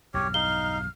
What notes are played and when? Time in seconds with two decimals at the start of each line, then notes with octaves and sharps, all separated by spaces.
0.14 B1 E2 G2 G4 C#5 F6
0.34 D#4 F5 G7